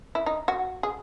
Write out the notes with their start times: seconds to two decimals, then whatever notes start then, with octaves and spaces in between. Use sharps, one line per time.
0.15 E4
0.26 D#4
0.48 F#4
0.83 G#4